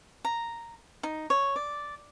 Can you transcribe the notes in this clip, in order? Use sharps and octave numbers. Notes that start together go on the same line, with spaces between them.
A#5
D#4
C#5
D5